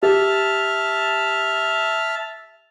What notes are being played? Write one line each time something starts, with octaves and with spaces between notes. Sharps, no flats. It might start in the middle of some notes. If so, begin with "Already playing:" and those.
G4 E5 A5 F6